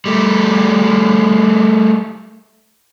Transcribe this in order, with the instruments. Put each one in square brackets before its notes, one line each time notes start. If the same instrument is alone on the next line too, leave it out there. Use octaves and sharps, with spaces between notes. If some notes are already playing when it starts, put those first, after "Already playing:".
[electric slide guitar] G3 A3